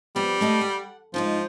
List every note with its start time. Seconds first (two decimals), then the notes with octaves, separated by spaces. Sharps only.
0.16 F3 G3 B3
0.41 A3 D#5 F5
0.61 F#5
1.14 G#2 F3 D#4 F4